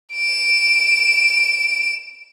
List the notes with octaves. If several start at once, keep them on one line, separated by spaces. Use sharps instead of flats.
D7 E7